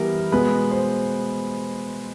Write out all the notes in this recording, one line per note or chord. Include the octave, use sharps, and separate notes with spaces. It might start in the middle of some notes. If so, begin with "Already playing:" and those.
Already playing: E3 G3 B3 A#4
B2 G#3 B3 B4
C5